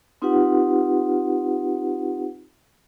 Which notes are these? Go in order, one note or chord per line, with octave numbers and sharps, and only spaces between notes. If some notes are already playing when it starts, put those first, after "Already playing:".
C4 D#4 F4 G4 B4 F#5